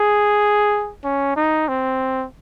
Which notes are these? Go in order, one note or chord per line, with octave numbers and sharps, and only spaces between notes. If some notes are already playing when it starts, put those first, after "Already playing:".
Already playing: G#4
C#4
D#4
C4